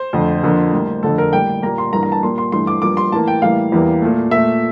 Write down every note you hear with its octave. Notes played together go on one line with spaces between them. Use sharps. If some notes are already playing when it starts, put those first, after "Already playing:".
Already playing: C5
F2 D3 A3
F2 D3 F3 A#3
A2 G3 A#3
F2 D3 A3 A4
A#4
A2 G3 A#3 G5
A#2 G3 A#3 A#5
C6
G2 E3 A#3 A#5
A#5
A5
A#2 G3 A#3 C6
C6
G2 E3 A3 C6
D6
G2 F3 A#3 D6
C6
A2 E3 A#3 A5
G5
A2 E3 G3 A#3 F5
E2 E3 G3 A#3
A#2 A3
A#2 A3 E5